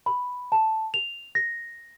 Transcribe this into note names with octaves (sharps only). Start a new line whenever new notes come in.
B5
A5
F7
A#6